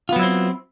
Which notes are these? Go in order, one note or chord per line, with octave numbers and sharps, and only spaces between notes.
F#3 B3 C4 E4 F4